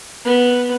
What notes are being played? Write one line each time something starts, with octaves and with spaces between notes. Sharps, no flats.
B3